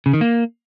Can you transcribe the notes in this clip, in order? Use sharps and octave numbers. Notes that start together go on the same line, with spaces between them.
C#3
D#3
A#3